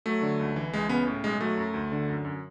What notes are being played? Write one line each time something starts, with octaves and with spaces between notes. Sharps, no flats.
F#3 A3
D3
C#2
E3
C#2 G#3
C#3 B3
A2
B1 G#3
F#3 A3
F#2
D2
D3
F#2
F#2